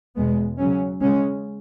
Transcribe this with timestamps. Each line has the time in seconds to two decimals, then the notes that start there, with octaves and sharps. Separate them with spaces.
0.16 E2 B2 G#3 B3
0.58 C#3 F#3 C#4
1.01 C#3 G#3 C#4